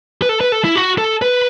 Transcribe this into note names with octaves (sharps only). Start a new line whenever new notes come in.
B4
A4
B4
A4
E4
F#4
A4
B4